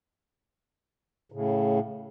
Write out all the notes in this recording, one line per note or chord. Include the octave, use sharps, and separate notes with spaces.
A2 C#3